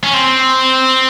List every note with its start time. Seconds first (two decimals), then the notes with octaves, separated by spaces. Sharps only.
0.04 C#4
0.14 C4